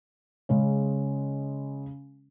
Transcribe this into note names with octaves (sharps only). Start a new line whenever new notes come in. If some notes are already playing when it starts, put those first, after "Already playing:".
C#3 G#3 C#4